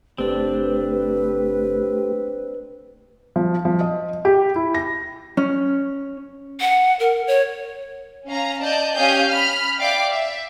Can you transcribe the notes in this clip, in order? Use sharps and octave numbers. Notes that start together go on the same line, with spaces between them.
F#1 A3 C4 D4 G4 B4
F3
F3
D#5
G4
E4
A#6
C#4
F#5
A#4
C#5
C#4 F5 A#5
D5 D#5 A5 G6
C#4 G4 F5 G#5 D#6 G6
B5 F6
D5 E5 F5 G5 D6
E5